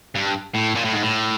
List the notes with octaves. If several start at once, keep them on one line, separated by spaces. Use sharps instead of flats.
G2
A2
A#2
A2
G#2
A2